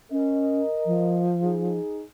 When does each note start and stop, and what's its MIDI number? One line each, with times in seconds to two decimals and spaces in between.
0.11 0.62 61
0.11 1.30 70
0.11 1.30 75
0.86 1.79 53
1.43 2.01 63
1.43 2.01 68